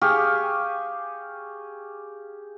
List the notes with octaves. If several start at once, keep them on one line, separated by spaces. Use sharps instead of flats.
G4 G#4 F5 C#6